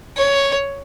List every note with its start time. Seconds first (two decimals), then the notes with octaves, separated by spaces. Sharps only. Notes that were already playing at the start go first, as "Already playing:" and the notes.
0.17 C#5